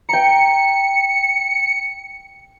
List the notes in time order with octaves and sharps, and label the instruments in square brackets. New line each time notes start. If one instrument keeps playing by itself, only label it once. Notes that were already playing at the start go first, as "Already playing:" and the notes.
[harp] G5 A#5 [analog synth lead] C#7